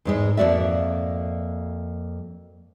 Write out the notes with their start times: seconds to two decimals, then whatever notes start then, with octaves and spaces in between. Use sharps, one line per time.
0.05 E2 G#2 G#3
0.37 F2 A#3 F#4 D5 E5